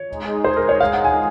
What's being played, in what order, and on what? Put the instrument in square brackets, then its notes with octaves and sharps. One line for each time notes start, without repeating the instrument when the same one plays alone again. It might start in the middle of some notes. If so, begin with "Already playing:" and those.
Already playing: [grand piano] C#5
[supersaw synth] G#3 D#4 G#4
[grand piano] C5
A#4
C#5
F5
F#5
G#5